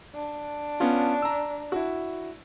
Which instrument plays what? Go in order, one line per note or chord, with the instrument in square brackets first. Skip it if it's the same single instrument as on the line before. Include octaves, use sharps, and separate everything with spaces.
[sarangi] D4
[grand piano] B3 C#4 F4
A#5 E6
E4 F#4